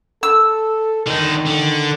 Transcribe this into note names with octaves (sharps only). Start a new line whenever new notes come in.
A4 E6
D3 D#3 D#4
D3